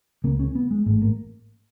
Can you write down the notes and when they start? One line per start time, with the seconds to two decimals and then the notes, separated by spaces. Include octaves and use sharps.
0.24 C#2 C#3 A#3
0.40 C#4
0.55 B3
0.71 G#3
0.86 A1 G#2 A3
1.02 A#3